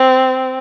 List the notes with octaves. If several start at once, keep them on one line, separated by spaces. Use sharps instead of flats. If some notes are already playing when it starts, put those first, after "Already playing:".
Already playing: C4